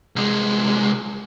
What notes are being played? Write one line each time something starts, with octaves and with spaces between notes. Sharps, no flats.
C2 G#3